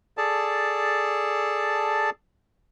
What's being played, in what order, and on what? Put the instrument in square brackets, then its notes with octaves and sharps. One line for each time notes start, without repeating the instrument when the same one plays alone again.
[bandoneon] G#4 A4 D5 A5